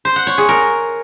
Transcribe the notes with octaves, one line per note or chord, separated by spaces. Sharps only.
C5
F#5
C#5
G#4
A#4